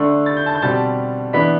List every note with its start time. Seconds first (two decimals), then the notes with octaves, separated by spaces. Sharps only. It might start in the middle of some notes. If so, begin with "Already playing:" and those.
Already playing: D3 A3 D4
0.26 A6
0.37 G6
0.46 A5 A6
0.55 G6
0.62 B2 G3 C4 A5 A6
1.33 E3 B3 D4 B5 B6